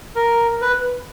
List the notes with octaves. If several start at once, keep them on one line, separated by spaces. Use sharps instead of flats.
A#4
B4